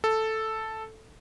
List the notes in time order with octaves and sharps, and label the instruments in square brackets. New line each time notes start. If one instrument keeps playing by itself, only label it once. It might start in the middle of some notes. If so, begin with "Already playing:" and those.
[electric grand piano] A4